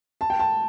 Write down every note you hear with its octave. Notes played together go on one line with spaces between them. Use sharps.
A5
G5
A5